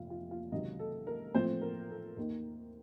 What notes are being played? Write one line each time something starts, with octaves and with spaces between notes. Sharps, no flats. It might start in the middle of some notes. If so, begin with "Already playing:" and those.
Already playing: F1 F2 C3 F4 F5
F4 F5
F4 F5
C#2 C3 D#3 F#3 D#4 D#5
A4
A#4
A2 F3 A3 C4 C5
A#4
A4
D#2 D#3 A#3 D#4 A#4